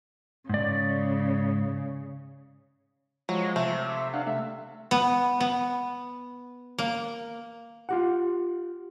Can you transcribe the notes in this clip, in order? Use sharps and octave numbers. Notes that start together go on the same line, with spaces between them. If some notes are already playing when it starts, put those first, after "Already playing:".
G#2 C#3 D5
F3 F#3 G#3
C3 A3
E5
D4 F5 F#5
A3 E5
B3
B3
A#3
F4 G4 F#5